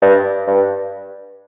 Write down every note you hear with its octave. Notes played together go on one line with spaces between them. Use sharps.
G2
G2